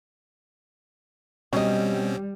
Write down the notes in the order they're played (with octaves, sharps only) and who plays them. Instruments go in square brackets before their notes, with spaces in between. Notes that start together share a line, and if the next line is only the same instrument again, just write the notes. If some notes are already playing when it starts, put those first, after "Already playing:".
[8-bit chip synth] B2 C4 C#4 [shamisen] F#3 D#5 [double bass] G3